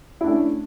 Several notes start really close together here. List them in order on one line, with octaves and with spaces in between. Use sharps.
E4 D4 A3 C#4